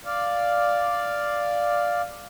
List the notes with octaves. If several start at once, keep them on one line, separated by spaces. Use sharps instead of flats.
D5 F5